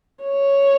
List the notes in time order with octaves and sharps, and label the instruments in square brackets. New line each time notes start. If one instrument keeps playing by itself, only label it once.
[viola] C#5